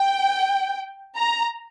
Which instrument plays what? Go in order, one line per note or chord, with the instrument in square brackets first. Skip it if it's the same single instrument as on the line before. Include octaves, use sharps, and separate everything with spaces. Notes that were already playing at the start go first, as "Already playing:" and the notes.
Already playing: [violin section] G5
A#5